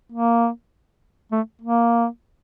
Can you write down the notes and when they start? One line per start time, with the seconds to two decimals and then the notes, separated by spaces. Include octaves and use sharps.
0.12 A#3
1.32 A3
1.62 A#3